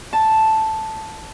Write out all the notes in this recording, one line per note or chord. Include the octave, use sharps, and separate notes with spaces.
A5